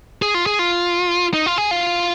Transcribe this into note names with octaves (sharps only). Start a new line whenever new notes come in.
G#4
F4
G#4
F4
D#4
F4
G#4
F4